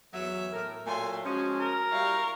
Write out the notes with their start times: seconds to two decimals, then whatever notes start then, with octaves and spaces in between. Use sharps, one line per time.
0.14 E2 F#3 E5
0.53 A2 A#4
0.86 A#2 F#3 A3 G#5 C6
1.24 F3 G#3 C#4 F#4
1.60 A#4
1.91 G3 E4 F5 C#6